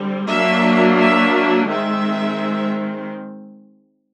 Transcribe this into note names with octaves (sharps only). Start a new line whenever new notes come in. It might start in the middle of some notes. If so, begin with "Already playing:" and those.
Already playing: D3 G3 C4
F#3 A#3 D4 E5
E5
D#3 G#3 C4 E5